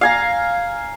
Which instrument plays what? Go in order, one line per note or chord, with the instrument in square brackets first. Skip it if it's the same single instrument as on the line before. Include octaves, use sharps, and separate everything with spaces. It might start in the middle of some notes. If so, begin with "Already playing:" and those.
[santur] F5 G#5 A#5